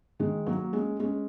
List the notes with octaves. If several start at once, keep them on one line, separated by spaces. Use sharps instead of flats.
D#3 G#3
F#3 A#3
G#3 C#4
G#3 C#4